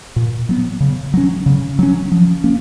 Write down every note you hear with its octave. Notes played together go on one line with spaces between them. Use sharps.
A#2
F#3 B3
C#3
F#3 C#4
C#3
F#3 C#4
F3
A#3 C#4